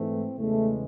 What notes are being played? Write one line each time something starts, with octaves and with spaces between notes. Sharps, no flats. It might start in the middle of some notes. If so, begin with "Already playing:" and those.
Already playing: G#2 E3 A3 C4
E2 C#3 E3 G#3 A3